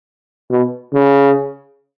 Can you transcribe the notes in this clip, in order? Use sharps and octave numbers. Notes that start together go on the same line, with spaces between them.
B2
C#3